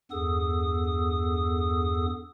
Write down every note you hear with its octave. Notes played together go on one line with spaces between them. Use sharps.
E2 G2 B3 G#4 A4 D#6